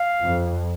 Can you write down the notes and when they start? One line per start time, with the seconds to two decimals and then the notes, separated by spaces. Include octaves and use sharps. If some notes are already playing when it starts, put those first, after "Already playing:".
Already playing: F5
0.22 F2